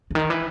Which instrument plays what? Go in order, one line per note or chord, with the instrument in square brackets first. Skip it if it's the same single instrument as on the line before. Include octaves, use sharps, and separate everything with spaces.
[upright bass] C#3
D#3
E3